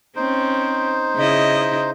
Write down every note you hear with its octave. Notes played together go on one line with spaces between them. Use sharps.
C4 C#4 D#4 C5
C#3 E4 D#5